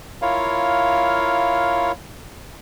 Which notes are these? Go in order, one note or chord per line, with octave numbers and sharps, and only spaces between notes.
E4 F4 A#4 C#5 F5